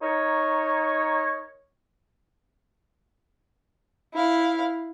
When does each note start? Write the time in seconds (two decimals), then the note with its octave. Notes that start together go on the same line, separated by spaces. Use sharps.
0.02 D#4 A#4 C#5
4.13 E4 F5